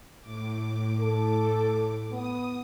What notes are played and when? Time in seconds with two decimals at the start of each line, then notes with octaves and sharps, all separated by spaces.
0.22 A2 D6
1.00 A4
2.12 B3 D#6